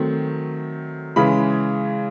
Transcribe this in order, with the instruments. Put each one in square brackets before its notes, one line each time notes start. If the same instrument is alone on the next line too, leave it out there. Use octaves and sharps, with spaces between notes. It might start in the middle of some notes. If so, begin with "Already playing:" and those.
Already playing: [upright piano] D#3 F#3 A3 C4
C#3 E3 G#3 B5